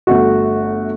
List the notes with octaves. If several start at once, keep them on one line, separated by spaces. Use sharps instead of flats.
G1 A3 F#4